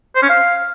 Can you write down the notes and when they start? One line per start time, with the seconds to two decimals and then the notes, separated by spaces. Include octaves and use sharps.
0.16 C5
0.23 C#4
0.29 F5